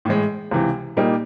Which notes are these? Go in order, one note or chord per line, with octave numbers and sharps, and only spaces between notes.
A2 E3 G#3
C#2 C3 E3
A#2 G3 A#3 D#4